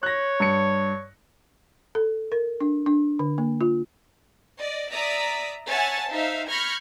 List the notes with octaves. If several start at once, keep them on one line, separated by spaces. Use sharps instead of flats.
C#5 F#6 A#6
G2 C#7
A4
A#4
D4
D4
D3
A#3
F4
D5 D#5
D5 E5 A#5 D#6 B6
C#5 E5 F#5 G#5 A5 A6
D#4 C5 E5 F5
B5 C#6 F6 G6 G#6 A#6